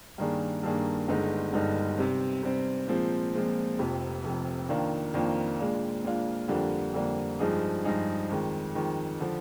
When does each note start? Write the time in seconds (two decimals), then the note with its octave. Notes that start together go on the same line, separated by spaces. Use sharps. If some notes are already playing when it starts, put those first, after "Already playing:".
0.18 G2 D#3 A#3 D4 G#4
0.63 G2 D#3 A#3 D4 G#4
1.08 G1 G2 D3 G#3 D#4
1.53 G1 G2 D3 G#3 D#4
1.98 C3 G3 C4
2.43 C3 G3 C4
2.88 A#2 F3 G#3 C4
3.34 A#2 F3 G#3 C4
3.78 F1 F2 C3
4.24 F1 F2 C3
4.69 F2 D#3 A#3 D4 F4
5.14 F2 D#3 A#3 D4 F4
5.59 A#2 G#3 D4 F4
6.04 A#2 G#3 D4 F4
6.48 F2 D3 G3 A#3 D4
6.94 F2 D3 G3 A#3 D4
7.39 G2 F3 G#3 D#4 G#4
7.84 G2 F3 G#3 D#4 G#4
8.29 F2 D#3 G#3
8.75 F2 D#3 G#3
9.20 D3 F3